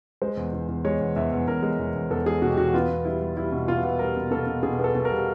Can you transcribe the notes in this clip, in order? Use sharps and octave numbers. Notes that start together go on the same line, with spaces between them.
G#3 C5
E2
E2
E2
G#3 C#5
E2
E2 E5
E2
E2 A#4
G#3
E2
E2
E2 A4
G#3 G#4
B2 F#4
G4
E2 F#4
B3 F4
B3
G3 E4
G3
G3 E4
B2
B2 F4
B3
G3 A#4
B2
B2 A4
B2
B2 G#4
B3 G#4
A4
B2
A#4
G3